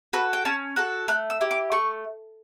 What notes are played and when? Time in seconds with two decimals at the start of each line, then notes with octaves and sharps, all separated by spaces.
0.13 F#4 A4 B4
0.33 G5
0.45 C#4 A5
0.76 F#4 A4 F#6
1.08 A3 F#6
1.30 E6
1.41 E4 G4
1.51 D6
1.72 A3 C#6